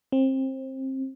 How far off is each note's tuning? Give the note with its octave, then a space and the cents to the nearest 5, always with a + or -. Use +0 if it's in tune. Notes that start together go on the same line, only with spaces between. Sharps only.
C4 +25